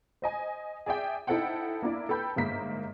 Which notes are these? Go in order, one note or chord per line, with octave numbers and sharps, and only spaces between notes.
C5 D#5 G#5
G#4 D5 E5 G5
D#4 E4 A4 C5 F#5 G5
A#3 D4 E4 D5
A4 B4 G5 B5 G6
G1 G#2 G#3 A#3 B6